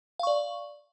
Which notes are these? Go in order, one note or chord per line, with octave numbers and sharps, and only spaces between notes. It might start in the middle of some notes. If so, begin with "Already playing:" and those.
D5 F5 C#6